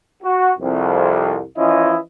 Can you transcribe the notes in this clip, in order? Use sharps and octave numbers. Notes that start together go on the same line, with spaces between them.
F#4
C2 F2
E3 F3 C#4 E4 F4 D#5